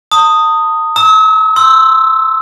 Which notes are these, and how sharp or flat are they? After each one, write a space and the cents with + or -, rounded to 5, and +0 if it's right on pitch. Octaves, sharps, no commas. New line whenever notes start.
A5 +40 D#6 +0
A#5 -10 E6 -45
C6 +5 E6 +0